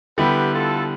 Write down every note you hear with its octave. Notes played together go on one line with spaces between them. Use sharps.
D3 G3 B3 E4 G4 B4
F4 A4